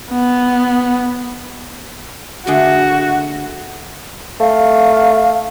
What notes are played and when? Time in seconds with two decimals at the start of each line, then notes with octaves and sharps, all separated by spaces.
0.11 B3
2.47 D3 A3 F#4 G#4
4.40 A3 F5